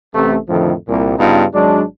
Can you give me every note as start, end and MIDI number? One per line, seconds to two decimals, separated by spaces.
0.14 0.36 33
0.14 0.36 48
0.14 0.36 57
0.49 0.73 41
0.49 0.73 45
0.49 0.73 50
0.49 0.73 51
0.49 0.73 53
0.87 1.17 36
0.87 1.17 46
1.18 1.44 43
1.18 1.44 49
1.18 1.44 59
1.18 1.44 62
1.18 1.44 63
1.18 1.44 65
1.53 1.83 32
1.53 1.83 54
1.53 1.83 56
1.53 1.83 62